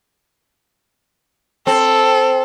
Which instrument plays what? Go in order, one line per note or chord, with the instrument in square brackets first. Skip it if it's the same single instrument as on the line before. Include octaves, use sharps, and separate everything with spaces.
[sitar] C4 [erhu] A4